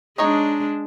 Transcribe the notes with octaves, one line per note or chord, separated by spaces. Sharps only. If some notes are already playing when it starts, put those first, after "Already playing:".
G#3 D4 D#4 C#5 D#5